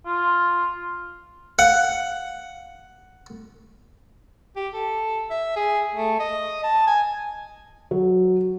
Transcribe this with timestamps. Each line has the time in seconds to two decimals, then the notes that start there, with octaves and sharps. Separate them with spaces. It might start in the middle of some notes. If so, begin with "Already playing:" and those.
0.06 F4
1.59 F5 F#5
4.56 G4
4.74 A4
5.30 E5
5.56 G#4
5.95 A3
6.19 D#5
6.63 A5
6.87 G#5
7.91 F#3